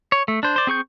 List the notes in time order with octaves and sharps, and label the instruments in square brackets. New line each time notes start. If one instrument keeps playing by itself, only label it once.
[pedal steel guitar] C#5
A3
D4 C5
C5 D5
C4 G#4 C#6 G6